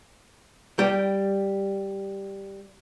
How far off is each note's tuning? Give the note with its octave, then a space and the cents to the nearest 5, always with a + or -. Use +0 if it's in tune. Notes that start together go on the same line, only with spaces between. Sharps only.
G3 +0 G5 -10